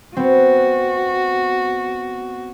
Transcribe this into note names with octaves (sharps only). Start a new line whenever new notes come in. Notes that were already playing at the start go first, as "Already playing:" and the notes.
B3 C4 F#4